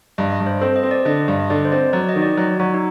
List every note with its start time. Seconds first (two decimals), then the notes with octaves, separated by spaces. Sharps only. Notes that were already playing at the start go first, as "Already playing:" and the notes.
0.18 G2 D#5
0.32 D#5
0.40 G2
0.46 C5
0.61 C4 A4
0.76 D#5
0.83 C4
0.91 D5
1.05 D3 D#5
1.28 G2
1.40 D#5
1.50 D3 D5
1.65 C5
1.72 C4 D5
1.93 F#3 D5
2.09 D#5
2.16 D#3
2.22 D5
2.37 F#3
2.60 F#3 F#4
2.74 D#4